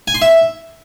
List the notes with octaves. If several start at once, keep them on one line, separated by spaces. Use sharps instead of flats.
G#5
C6
E5